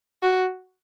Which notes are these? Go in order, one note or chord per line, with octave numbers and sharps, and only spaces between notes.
F#4